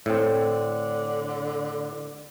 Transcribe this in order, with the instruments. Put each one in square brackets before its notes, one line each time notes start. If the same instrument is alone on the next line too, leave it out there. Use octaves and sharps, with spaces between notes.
[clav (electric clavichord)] A2 C4 [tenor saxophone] D3